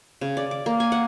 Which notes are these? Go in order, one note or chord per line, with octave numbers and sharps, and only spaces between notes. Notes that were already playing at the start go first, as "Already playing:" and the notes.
C#3
D5
D6
A#3
G#5
F#5